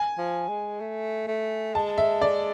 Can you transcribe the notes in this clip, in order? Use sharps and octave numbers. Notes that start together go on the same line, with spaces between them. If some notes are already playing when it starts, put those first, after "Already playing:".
Already playing: G#5
F3
G#3
A3
A3
G#3 A5
E5
D5